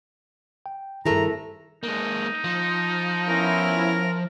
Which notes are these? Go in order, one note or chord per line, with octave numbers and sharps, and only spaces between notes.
G5
G2 C3 D#3 A3 E4 G#4 A#4 A#5
G#3 A#3 D#4
F3
B3 C#4 E4 A#4